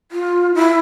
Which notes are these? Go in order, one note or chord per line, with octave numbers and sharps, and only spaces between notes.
F4
E4